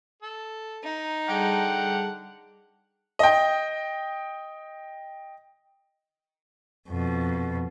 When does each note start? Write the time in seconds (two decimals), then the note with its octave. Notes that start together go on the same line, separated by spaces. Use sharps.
0.22 A4
0.83 D#4
1.29 D3 G3 G#4 F#5 G5 A5
3.19 D#5 G5
6.89 F2 B2